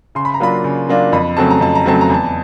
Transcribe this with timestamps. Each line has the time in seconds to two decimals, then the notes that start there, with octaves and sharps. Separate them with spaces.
0.15 C#3 C6
0.25 B5
0.34 A#5
0.40 F#3 A#3 D4 F4 B5
0.64 C#3
0.89 F#3 A#3 D4 F4
1.12 F2 B5
1.37 C#3 F#3 A3 C4 A5
1.50 A#5
1.61 F2 A5
1.75 A#5
1.85 C#3 F#3 A3 C4 A5
2.01 A#5
2.10 E2 A5